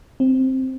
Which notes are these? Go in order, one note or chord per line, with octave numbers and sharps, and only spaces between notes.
C4